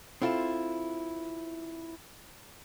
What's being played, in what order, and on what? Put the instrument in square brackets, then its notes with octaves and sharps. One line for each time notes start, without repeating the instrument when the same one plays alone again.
[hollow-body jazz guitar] C4 E4 F4 A4